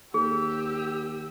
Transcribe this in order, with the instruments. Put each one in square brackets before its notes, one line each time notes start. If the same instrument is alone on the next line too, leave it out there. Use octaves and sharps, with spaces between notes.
[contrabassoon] D#2 [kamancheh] G4 E6 [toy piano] G#4